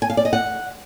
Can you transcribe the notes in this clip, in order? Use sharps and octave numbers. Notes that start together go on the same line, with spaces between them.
G#5
F5
D5
D#5
F#5